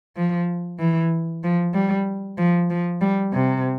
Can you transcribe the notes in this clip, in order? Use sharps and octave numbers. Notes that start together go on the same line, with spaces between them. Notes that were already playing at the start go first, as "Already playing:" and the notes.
F3
E3
F3
G3
F3
F3
G3
C3